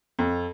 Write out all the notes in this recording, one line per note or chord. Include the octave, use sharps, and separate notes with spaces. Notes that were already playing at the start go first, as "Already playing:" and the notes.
F2